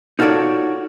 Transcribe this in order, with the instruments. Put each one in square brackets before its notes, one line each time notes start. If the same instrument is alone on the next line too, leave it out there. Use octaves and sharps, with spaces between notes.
[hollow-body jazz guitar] D#4 F4 F#4 A4 C#5 D5